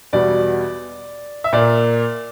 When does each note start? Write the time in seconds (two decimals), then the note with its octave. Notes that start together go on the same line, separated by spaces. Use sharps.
0.13 E2 B2 G3 D5
1.44 E5
1.53 A#2 A#3 D5